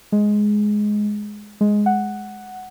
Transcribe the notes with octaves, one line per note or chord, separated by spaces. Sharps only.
G#3
G#3
F#5